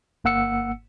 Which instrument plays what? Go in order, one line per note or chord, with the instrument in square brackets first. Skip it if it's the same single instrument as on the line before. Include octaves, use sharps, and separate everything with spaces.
[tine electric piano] G1 A#3 F#5 E6 C#7